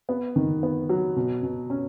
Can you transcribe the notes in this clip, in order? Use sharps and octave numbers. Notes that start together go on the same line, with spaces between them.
B3
D#3
B3
F#3
B2
B2
C#4